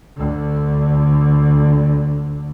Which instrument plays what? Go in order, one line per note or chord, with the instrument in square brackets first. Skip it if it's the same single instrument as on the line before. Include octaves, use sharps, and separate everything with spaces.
[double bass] D2 D3